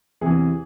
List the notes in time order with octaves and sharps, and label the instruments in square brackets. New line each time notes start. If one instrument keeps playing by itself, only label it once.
[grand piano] E2 C3 E3 G#4